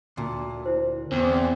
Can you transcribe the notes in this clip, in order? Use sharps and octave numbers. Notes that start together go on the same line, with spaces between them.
D2 A#2
E4 C5
E2 C4